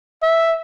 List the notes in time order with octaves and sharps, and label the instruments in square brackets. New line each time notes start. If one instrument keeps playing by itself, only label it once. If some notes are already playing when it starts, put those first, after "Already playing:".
[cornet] E5